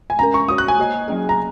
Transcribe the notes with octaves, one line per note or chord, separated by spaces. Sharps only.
G#5
G#3 C#4 A#4 A#5
C#6
G#3 F#4 C#5 D#6
F#6
G#5
A#3 F#4 D#5
F#3 A#3 C#4 G#4
A#5